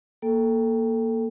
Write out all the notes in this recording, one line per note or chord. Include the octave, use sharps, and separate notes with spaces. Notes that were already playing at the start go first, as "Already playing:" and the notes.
A#3 A4 G5